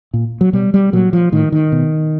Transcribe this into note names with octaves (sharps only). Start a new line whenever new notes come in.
A#2
F#3
B2 G3
G3
A#2 F#3
F3
A2 D#3
D#3
B2